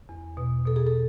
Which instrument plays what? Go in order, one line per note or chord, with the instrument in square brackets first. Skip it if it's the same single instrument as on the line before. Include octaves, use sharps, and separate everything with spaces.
[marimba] E2
B2
B2 A4
G#4
A4